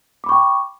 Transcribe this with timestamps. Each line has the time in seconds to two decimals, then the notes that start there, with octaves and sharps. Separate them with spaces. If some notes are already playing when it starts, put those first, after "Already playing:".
0.24 D6
0.26 B5
0.29 C#6
0.32 G5